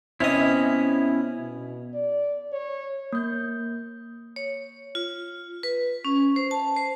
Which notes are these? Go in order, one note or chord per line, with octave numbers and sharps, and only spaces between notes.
C3 B3 C#4 E4 D#5
B2
D5
C#5
A#3 G6
C#5
F4
B4
C#4
C5
A5
C5